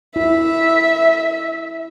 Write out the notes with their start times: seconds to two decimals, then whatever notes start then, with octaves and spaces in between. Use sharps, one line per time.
0.16 E4 E5